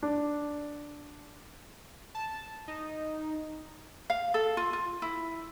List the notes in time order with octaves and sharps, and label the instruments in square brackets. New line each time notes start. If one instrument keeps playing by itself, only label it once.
[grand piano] D4
[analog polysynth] A5
D#4
[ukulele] F5
A4
F4
F4
E4